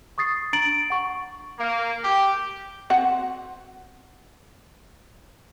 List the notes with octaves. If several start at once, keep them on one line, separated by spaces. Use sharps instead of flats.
C#6 D#6 A6 C7
D4 A#5 A6 D7 F#7
F#5 C#6
A#3
G4
C4 F#4 F#5